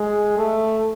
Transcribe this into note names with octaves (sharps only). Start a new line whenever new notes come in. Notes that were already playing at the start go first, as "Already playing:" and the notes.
Already playing: G#3
A3